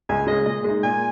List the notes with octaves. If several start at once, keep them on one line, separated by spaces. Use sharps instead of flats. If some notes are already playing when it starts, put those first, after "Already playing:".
C#2 G#5
C#3 G#3 D#5
A#2 D#5
G#3 D#4
A#2 G#5